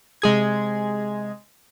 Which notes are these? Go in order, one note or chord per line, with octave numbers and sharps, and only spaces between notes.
C3 G#3 G#4 G#6